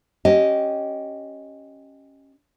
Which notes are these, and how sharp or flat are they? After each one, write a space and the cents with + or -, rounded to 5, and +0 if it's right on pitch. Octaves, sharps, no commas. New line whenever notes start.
C#4 -10 G4 -20 D#5 +0